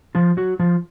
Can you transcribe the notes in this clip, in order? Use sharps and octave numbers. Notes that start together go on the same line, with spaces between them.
F3 F4
F#3 F#4
F3 F4